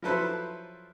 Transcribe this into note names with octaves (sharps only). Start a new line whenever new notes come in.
F3 F#3 E4 A4 B4 C5